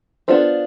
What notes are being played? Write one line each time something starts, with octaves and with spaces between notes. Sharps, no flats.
B3 D4 F4 A4 C5